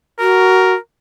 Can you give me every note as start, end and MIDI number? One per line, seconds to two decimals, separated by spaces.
0.20 0.74 66
0.20 0.78 70